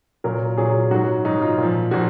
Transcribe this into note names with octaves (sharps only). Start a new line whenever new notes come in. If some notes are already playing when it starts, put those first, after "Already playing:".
A#2 F#3 A#4
A#2 F#3 G#4
G#2 F#3 F#4
G#2 F#3 D#4
F4
A#2
F3
A#2 F3 F#4